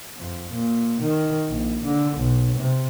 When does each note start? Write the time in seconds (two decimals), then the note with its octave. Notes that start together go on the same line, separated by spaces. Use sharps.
0.18 F2
0.51 A#2
1.01 D#3
1.50 A#1
1.84 D3
2.17 B1
2.57 C3